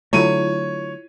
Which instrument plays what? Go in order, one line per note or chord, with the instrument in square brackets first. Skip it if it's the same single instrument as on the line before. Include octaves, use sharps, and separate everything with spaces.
[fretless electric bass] D3 F#3 A3 [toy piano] E4 F4 [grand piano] C#5 D#7